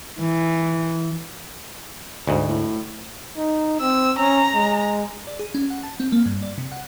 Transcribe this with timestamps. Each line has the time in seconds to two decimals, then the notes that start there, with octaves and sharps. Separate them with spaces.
0.20 E3
2.27 D2 G#2
2.48 A2
3.37 D#4
3.81 C4 E6
4.19 C#4 A#5
4.54 G#3
5.27 D5
5.39 G#4
5.54 C#4
5.70 F#5
5.83 A5
6.00 C4
6.12 A#3
6.26 G2
6.43 D5
6.58 C3
6.72 F#5